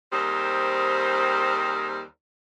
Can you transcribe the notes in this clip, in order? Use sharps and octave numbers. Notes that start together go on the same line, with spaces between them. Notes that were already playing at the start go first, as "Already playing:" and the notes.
D#2 G3 C4 G#4 A#4 C5